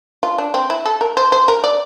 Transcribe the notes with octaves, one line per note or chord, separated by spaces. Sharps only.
F4
D4
C4
E4
A4
A#4
C5
C5
A#4
D5